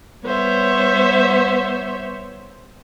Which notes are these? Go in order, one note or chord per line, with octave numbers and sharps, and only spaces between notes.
G3 B3 C5 C#5 E5